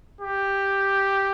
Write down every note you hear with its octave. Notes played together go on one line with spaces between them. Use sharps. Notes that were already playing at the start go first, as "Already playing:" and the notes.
G4